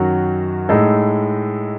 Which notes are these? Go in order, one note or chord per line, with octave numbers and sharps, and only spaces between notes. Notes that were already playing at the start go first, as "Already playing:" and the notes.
Already playing: F#2 D#3 F#3 F#4
A2 G#3 D#4 A4